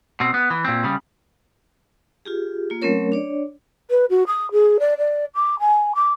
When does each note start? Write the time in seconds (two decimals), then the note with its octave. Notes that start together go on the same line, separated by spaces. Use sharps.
0.20 B2 C4
0.34 B3
0.50 E3
0.65 A#2 C4
0.84 C#3 G3
2.25 F4 G4 G#4
2.70 A#3 F4
2.82 F#3 A3 C4 C#4 A#4 C#5
3.12 D4 C#5 D5
3.90 B4
4.09 F#4
4.27 D#6
4.51 G#4
4.79 D5
4.98 D5
5.34 D6
5.59 G#5
5.95 D6